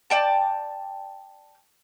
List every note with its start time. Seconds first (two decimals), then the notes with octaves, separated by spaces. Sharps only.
0.10 D5 G5 A5